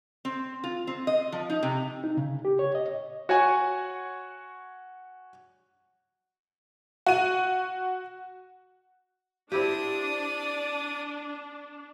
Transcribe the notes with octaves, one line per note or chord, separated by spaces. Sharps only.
C4
F4
C4
D#5
F3
D#4
C3
D#4
C#3
G4
C#5
D#5
F#4 C#5 F#5 G#5
F#4 D#7
C4 D4 E4 G4 D5 D#6